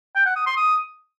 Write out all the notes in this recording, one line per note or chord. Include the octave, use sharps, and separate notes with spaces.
G5
F#5
D#6
C6
D#6